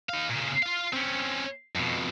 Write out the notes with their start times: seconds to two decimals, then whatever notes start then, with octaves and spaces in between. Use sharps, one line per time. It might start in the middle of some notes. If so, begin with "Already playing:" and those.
0.09 D#4 F5
0.29 A#2 C#3
0.63 F4 F5
0.93 C4 C#4
1.75 F2 B2